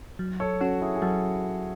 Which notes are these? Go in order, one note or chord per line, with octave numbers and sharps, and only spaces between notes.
F#3
A4 C#5
C#4 F#4 A4
E4 G#4
G#4
F#3 F#4 A4